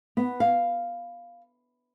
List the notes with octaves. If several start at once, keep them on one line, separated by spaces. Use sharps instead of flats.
B3
F5